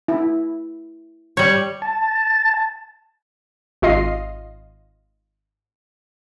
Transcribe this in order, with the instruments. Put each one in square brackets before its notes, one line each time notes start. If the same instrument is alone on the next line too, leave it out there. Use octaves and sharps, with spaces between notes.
[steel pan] E4
[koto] G3 C#5
[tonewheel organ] A5
[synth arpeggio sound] G#1 F4 D#5 C7